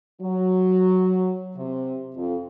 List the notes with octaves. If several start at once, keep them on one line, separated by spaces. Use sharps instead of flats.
F#3
C3
F2